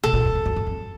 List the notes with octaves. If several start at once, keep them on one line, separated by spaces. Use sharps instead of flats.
B2 A4
A#2
E2
F2
F#2
F#2
F2